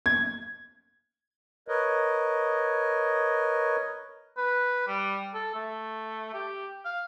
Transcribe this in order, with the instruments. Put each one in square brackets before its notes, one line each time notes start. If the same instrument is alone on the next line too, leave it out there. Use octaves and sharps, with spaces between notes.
[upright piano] G#6
[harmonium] A#4 B4 C#5 D#5
[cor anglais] B4
G3
A4
A3
G4
F5